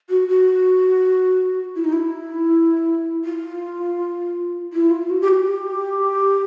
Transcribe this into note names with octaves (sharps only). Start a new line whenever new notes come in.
F#4
F#4
E4
D#4
E4
F4
E4
F4
F#4
G4
F#4
G4